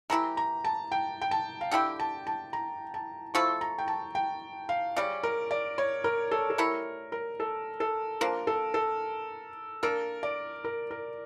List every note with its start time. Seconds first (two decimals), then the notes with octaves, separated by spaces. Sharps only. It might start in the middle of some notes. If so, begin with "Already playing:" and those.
0.10 E3 A3 E4 G4 A#5
0.37 A#5
0.65 A5
0.92 G5
1.22 G5
1.31 A5
1.61 F5
1.71 D3 A3 E4 G4 G5
2.00 A5
2.27 A5
2.53 A#5
2.94 A5
3.34 F3 A3 E4 A4 C#6
3.61 A#5
3.78 G5
3.88 A5
4.15 G5
4.69 F5
4.96 C#3 G3 C#4 D5
5.23 A#4
5.51 D5
5.78 C#5
6.04 A#4
6.31 A4
6.50 A4
6.58 A3 E4 G4 A#4 C#5
7.12 A#4
7.40 A4
7.80 A4
8.21 F3 A#3 D4 A#4
8.47 A4
8.74 A4
9.83 A#3 D4 A4 A#4
10.23 D5
10.64 A#4
10.91 A#4